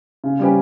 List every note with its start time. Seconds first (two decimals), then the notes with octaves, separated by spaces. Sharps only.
0.24 C#3
0.39 G3 C#4 G4 B4